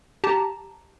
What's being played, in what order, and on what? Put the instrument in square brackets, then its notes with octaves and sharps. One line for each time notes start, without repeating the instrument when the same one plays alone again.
[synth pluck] G4 A5 A#5